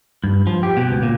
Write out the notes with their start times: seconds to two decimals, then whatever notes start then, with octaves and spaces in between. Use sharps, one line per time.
0.24 G2
0.47 F3
0.63 G4
0.77 B2
0.91 C#2
1.03 A#2